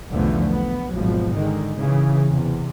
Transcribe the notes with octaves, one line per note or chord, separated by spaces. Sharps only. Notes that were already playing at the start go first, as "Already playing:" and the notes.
B1 E2 D3 F3 A3 B3
B3
G#1 B2 F3 F#3
D3 D#3 G#3
C#3 E3
E2 C3